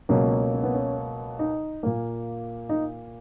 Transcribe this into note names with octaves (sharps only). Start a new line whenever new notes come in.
C#2 B2 F#3 A#3
C#4
B3
C#4
D#4
A#2 A#3
D#4